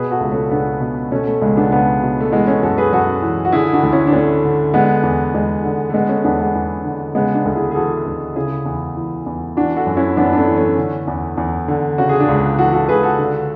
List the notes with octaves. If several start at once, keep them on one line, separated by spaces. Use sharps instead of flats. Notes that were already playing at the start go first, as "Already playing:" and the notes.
Already playing: B2 G#4 B4
F#4 A4
C#2
A3 C#4
C#2 B3 D4
B2
B2 A3 C#4
A3
C#2 G#3
B3 D4
C#2 B3 D4
B2
A3
E3 G#3 B3
A3 C#4
F#2 F#4 A4
G#4 B4
F#2 F#4 A4
E3
F#4
D3 E4 G#4
D4 F#4
D2
C#4 E4
D4
D2 A3 C#4
D3
D3 G#3 B3
E2
E2 G#3
D3
A3
D3 G#3 B3
A3 C#4
E2 B3 D4
G#3 B3
E2
D3
C#3 G#3 B3
B3 D4
D2
E4 G#4
G#4
E3 F#4 A4
D2
C#3 E4 G#4
E2
E3
E2
E3 D4 F#4
F#4 A4
F#2
C#4 E4
F#2 B3 D4
D4
A3 C#4
E3
A3 C#4
D3
E2
E2
D3
C#3 F#4
G#4
D4 F#4
C#2
E3 F#4 A4
F#4 A4
C#2 G#4 B4
F#4 A4
D3